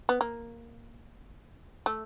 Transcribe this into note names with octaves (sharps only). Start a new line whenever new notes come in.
B3
A#3
A3